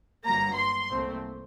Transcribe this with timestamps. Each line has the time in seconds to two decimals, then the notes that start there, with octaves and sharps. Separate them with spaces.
0.24 G1 G2 F#3 A#3 A#5
0.57 C6
0.90 C2 A#2 A3 C4